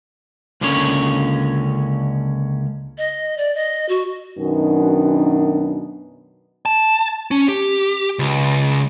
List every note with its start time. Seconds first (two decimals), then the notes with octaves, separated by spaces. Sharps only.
0.61 C#2 D3 A#3 C#4 C#5
2.98 D#5
3.38 D5
3.55 D#5
3.89 F#4
4.39 F#2 B2 D#3 B3 D4 D#4
6.66 A5
7.31 C#4
7.49 G4
8.19 C#2